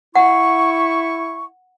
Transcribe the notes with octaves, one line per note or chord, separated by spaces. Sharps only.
E4 F#5 C#6